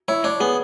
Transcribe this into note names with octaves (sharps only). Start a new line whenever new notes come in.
E4 C#5
D4 C#5
B3 G#4